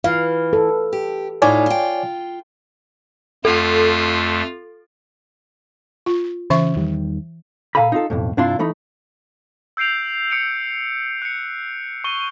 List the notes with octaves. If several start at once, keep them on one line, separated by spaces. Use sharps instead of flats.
E3 F5
A4
G4
A2 D#4 F4 C#5 D5 G#5
F4 G5
F2 A3 F4 A4
F4
C#3 E3 E5 C#6
E2 D#3 G3
A#2 A4 F5 G#5 A#5 B5
D#4 F4 A4
B1 F2 A2
G2 C3 D4 E4 F4 C6
E3 A3 D#4 B5
E6 G6 C7 D7 F7
E6 C#7 D7 F7
F#6 C#7
C#6 D#7 G7